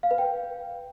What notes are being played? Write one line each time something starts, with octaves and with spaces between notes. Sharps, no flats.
F5
B4
G5